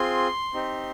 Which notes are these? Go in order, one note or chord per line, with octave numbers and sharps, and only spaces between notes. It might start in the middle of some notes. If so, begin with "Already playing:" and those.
Already playing: C4 F4 G#4 C6
C4 D#4 G4